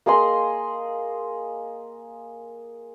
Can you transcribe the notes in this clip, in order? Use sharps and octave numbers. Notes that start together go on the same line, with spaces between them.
A#3 G#4 D#5 C6